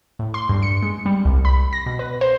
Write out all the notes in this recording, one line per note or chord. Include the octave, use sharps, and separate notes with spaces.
A2
C6
G2
C#7
G#3
G3
C2
B5
A#6
B2
B4
C5